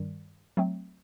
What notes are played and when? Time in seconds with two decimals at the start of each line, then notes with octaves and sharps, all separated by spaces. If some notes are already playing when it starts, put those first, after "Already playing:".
Already playing: G2 D#3 G3
0.57 F#3 A3 C4